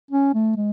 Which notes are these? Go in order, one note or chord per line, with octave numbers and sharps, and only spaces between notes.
C#4
A3
G#3